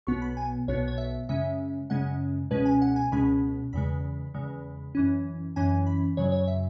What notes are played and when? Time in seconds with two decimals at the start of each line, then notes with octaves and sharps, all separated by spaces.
0.07 B1 B2 B3 C#6
0.22 B5
0.37 G#5
0.68 B1 B2 B3 C#5
0.88 C#5
0.98 E5
1.29 F#2 C#3 G#3 C#4 E5
1.90 F#2 C#3 G#3 C#4 F#5
2.51 C#2 B2 G#3 C#4 B4
2.65 G#5
2.82 F#5
2.96 G#5
3.12 C#2 B2 G#3 C#4 B5
3.73 E2 C#3 G#3 B5
4.34 E2 C#3 G#3
4.95 F#2 E3 C#4
5.56 F#2 E3 C#4 G#5
5.86 B5
6.17 F#2 C#3 F#3 C#5
6.32 C#5
6.47 E5